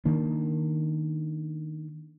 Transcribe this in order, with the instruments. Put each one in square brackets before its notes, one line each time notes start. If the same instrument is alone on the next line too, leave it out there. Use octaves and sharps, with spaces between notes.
[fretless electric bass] D#3 A#3 D4